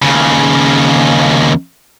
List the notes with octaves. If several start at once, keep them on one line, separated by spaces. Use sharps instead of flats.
D#2 C#3